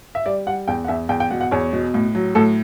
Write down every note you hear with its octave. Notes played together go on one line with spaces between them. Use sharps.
E5
G3 D5
G3 F#5
E2 G5
F#5
E2 E5
E2 G5
G5
B2 F#5
F#5
E2 C#5
B2
A2
F#3
A2 A4